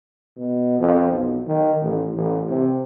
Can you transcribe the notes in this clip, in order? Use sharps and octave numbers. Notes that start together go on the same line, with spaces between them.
B2
F2
B1
D#3
A1
A1
C3